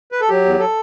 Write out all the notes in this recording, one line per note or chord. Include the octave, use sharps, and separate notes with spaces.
B4
A4
F#3 G4
E2
A4